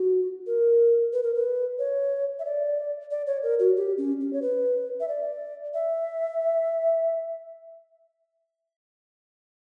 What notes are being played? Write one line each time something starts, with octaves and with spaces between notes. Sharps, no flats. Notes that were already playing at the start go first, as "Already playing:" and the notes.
Already playing: F#4
A#4
B4
A#4
B4
C#5
E5
D5
D5
C#5
A#4
F#4
G4
C#4
C#4
C#5
B4
E5
D5
E5